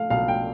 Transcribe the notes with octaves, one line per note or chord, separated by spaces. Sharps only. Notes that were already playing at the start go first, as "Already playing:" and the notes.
Already playing: A3 F5
B1 F5
G5